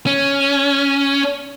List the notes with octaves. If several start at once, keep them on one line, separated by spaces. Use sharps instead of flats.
C#4